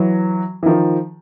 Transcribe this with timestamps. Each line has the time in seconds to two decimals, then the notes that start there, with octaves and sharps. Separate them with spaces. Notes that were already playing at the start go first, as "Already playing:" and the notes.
Already playing: E3 F#3
0.63 E3
0.66 D#3 F3